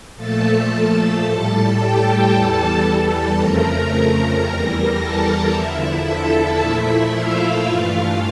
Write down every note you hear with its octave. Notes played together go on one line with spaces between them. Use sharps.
A#2 F3 A3 A4 A5
A4 A5
A2 G3 A4 A5
G4 G5
E2 E3 G3 A4 A5
A4 A5
F2 C#3 F3 A3 A#4 A#5
E2 E3 G3
A4 A5
E2 D3 F3 E4 E5
A4 A5
A#2 F3 A3 E4 E5
F4 F5
G2 E3 A3 F4 F5